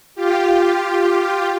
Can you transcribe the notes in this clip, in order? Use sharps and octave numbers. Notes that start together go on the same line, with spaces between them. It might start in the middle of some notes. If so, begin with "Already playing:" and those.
F4 G4